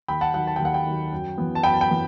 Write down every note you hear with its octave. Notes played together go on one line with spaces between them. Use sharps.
D#2 G5 B5
F#5 A5
D#3 F#3 F#5
A5
D#2 G5
F#5
G5
D#3 F#3
F#2
E3 B3
A5
F#2 G5 B5
A5
G5 B5
E3 B3